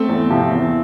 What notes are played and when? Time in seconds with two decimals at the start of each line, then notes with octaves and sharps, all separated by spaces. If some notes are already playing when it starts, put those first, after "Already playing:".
Already playing: A3 C4
0.09 E2
0.30 C3 F3
0.51 E2